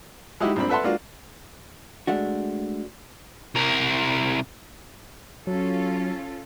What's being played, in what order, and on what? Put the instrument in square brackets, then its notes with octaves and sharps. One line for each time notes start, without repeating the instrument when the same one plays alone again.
[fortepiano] G#3 D#4 E4 F#4 G4
A#1 G2 C4 B5
A4 B4 E5 F#5 A5 C6
G#3 A#3 D4 F4 F#4
[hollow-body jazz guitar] G#3 A3 D4 F#4
[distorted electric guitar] C2 A#4
[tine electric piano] F#3 [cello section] C#4 F4 A4